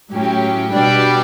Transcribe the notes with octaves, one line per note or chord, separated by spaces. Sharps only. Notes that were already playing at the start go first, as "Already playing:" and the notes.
A2 F#3 C#4 G4
B2 G3 D4 G4 D5